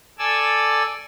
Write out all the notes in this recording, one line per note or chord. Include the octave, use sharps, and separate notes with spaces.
A4 D5 G#5 E6